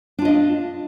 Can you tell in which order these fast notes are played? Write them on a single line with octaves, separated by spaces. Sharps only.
D4 F4 D#5 F5